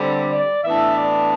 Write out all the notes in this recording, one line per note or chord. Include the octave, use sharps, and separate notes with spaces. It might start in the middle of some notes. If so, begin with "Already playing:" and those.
Already playing: D3 G3 C4
D5
A2 E3 B3 D4 E5
D5